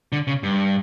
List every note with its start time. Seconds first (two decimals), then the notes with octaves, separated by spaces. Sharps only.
0.12 D3
0.27 C#3
0.43 G2